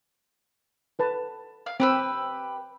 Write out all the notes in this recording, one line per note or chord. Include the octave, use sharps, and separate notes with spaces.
A4 B4 A5
F5
C4 G4 B4 E6